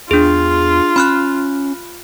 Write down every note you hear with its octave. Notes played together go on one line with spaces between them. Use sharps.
E2 D4 F4 G#4
C#4 B5 F6 F#6